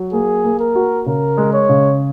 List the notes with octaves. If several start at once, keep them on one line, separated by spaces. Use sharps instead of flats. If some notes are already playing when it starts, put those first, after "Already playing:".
Already playing: F#3
A#3 G#4
A#3
A#4
F#4
C#3 A#4
G#3
C#5
C#3